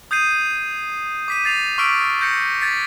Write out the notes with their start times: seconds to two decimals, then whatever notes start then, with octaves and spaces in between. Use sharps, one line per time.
0.11 D#6 G6 G#6 C7 D#7
1.28 D6 B6 D#7
1.45 A6 C7 F7
1.78 C#6 D6 E6 F6 B6 D7
2.21 G6 A#6 C#7
2.62 G#6 A6 B6